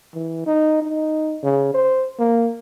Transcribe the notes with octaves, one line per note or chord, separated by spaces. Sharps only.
E3
D#4
D#4
C#3
C5
A#3